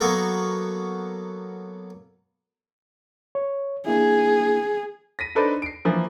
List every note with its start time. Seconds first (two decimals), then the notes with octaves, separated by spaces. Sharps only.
0.01 F#3 A#3 B3 F#4 A4 A#4
3.35 C#5
3.86 A#3 D4 E4 G#4
5.19 A#6 B6 D#7
5.35 D4 D#4 A4 B4 C5 D5
5.62 C7 D7
5.85 E3 F3 A#3